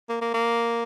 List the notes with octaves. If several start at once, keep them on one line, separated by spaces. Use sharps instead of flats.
A#3
A#3
A#3